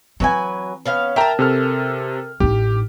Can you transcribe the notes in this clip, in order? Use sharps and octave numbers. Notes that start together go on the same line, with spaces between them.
E3 F#3 C4 B4 G#5
B3 C#4 F5
A#4 E5 G5 A5 A#5
C3 A4 F6
A1 D#4 G4